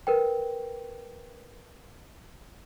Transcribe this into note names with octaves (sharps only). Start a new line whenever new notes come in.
A#4 B4 G5